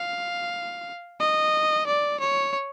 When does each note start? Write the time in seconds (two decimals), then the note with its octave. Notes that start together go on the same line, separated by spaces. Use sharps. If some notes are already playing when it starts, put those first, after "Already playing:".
Already playing: F5
1.20 D#5
1.86 D5
2.20 C#5